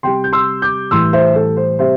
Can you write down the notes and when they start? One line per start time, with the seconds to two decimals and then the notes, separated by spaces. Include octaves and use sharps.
0.03 C3 G3 G5 C6
0.24 G6
0.33 C6 E6
0.62 D6 G6
0.91 A2 E3 G3 C6 E6
1.13 C5 E5
1.36 A4
1.57 C5
1.79 C3 G3 C5 E5